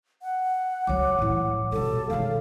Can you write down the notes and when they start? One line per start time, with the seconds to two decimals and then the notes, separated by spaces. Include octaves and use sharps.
0.22 F#5
0.87 C#2 F#3 C#5 D6
1.19 A2 E3
1.72 B2 G3 A4
2.10 D#3 G#3 F5